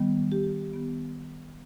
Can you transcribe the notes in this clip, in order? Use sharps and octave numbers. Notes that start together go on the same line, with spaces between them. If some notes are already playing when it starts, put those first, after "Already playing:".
Already playing: D#3 G3 B3
G4
D#3 B3